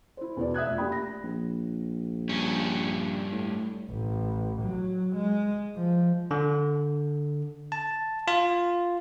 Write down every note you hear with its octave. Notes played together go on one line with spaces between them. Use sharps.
E4 C5
E2 B2 E4 G#4 D5
E5 D#6 F#6 G#6
F1 F2
A#3 D4 G4 A#4 G5 B5
A#6
A#1
G2 C#4
A2
A1
F#3
G#3
F3
D3
A5
F4